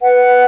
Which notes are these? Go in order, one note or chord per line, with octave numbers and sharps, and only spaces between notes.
B4 F#5